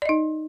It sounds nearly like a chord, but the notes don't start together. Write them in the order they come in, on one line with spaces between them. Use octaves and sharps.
D5 D#5 D#4